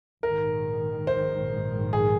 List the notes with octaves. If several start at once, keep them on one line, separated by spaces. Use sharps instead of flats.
A#1 G#2 D#3 A#4
C5
G#4